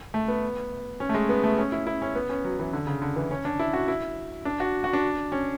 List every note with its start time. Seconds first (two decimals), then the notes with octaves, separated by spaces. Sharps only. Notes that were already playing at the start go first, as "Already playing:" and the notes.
0.14 A3
0.28 B3
1.00 C#4
1.09 A3
1.15 G#3
1.29 B3
1.44 A3
1.58 C#4
1.72 E4
1.87 E4
2.02 C#4
2.15 B3
2.30 C#4
2.44 F#3
2.59 E3
2.73 D3
2.87 C#3
3.02 D3
3.16 E3
3.31 C#4
3.45 D4
3.59 E4
3.73 F#4
3.88 E4
4.45 D4
4.60 F#4
4.84 F#4
4.93 D4
5.32 C#4